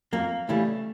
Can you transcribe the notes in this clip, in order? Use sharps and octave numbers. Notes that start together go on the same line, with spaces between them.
F2 A#3
C#3 E3 G3 A3